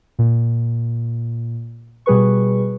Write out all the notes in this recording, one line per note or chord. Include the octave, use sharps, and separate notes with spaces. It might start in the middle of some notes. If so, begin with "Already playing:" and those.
A#2
B2 G3 G#4 B4 C#6